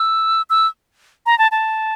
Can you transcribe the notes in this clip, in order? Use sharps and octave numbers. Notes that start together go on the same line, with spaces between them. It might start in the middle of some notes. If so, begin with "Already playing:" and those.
Already playing: E6
E6
A#5
A5
A5